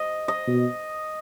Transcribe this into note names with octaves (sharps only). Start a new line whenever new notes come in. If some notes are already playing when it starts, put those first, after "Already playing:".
Already playing: D#5
D#5
B2